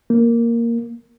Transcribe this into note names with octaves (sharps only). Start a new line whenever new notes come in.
A#3